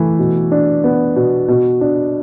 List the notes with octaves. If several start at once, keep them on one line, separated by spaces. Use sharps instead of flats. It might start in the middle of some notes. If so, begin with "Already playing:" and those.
Already playing: E3 A3
B2
D4
B3
B2
B2
D4